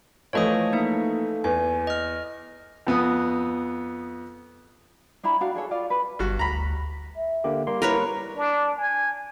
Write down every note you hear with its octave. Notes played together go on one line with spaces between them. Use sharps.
E3 F3 A3 C#5 D#5 D#6
A#3 D#4 E5
E2 G#5
D#5 F6
F2 B3 D#6
D4 E4 A#5 B5
D4 F#4 F5
D4 G#4 A4 C#5
F4 D5 F5
B4
G1 G2 F#4
D2 A#5 B5
E5
D3 A#3 G4
G3 A#3 C6
E4 A#4 B4 C#5
D4
G#5